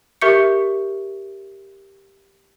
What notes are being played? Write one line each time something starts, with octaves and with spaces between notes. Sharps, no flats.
G4 A#4 E5 C#6 G6 C#7